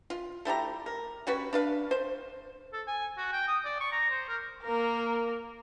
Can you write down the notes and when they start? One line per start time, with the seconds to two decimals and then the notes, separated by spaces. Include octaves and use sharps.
0.10 F4
0.45 A3 E4 G4 A#5
0.86 A#4
1.27 G3 C#4 F#4 B4
1.53 D4 B4 F5
1.91 C5
2.73 A4
2.87 G#5
3.17 F#4
3.33 G5
3.47 D#6
3.64 D5
3.80 C#6
3.92 A#5
4.10 C5
4.28 A#4
4.63 A#3 A#4